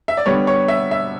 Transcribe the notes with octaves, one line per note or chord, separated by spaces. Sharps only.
E5
D5
D3 G3 B3 C#5
C#5
E5
E5